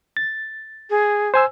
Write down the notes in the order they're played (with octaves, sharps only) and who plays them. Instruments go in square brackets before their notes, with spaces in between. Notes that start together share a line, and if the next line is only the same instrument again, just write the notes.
[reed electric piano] A6
[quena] G#4
[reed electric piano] C5 G#5 E6